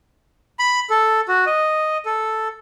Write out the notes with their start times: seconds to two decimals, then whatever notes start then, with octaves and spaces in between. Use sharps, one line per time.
0.59 B5
0.90 A4
1.28 F#4
1.46 D#5
2.06 A4